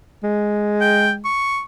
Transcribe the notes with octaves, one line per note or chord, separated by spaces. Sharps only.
G#3
G5
C#6